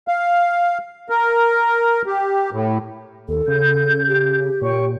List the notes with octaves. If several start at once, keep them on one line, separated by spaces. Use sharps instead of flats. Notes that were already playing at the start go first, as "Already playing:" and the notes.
F5
A#4
G4
A2
D#2 A4
C#3 G6
G4
A#2 C#5 G5 C#6